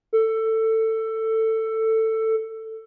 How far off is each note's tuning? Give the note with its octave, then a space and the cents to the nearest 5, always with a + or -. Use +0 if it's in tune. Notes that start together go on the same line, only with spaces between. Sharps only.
A4 +15